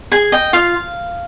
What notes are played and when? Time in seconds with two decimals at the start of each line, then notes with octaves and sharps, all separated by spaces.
0.12 G#4 G#5
0.32 D#5 G5
0.53 F4 F5